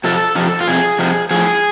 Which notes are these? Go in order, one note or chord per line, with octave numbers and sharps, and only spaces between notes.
F2 C3 A4
F2 C3 F3
F4
F2 C3 G#4
F2 C3 F3
A2 F3 G#4